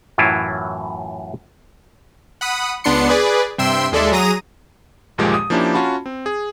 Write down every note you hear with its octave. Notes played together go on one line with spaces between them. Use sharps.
F#2 A2 E3 F#3 E4 F4
F#5 B5 D#6
C#2 B3 D4 C6 C#7
G#4 B4 D5
G2 C3 E5 G5 C6 E6
D#2 G#3 A4 D5 E5 C6
F#3 G#4 A#5 D#6 A#6 D#7
G1 D#2 A#2 F3 G#3 G4
D#6
F3 A#3 C#4 D4 E4 G4
C#4 F4 F#4 A5 B5
C4
G#4